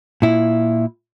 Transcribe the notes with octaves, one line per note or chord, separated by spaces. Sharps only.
A#2 E4